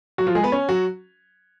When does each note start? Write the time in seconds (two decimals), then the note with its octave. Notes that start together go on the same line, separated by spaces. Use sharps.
0.18 F#3 F#4
0.27 F3 F4
0.35 G#3 G#4
0.43 B3 B4
0.52 C#4 C#5
0.69 F#3 F#4